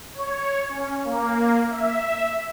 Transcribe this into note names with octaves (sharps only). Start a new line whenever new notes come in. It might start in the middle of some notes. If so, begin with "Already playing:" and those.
C#5
C#4
A#3
E5